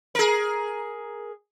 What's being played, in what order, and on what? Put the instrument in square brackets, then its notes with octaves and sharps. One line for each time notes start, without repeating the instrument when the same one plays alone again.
[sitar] G#4 A#4